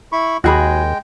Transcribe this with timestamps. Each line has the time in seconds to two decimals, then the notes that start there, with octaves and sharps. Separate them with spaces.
0.12 E4 B5 C#6
0.44 D#2 G#3 F#4 G#4 G5 B5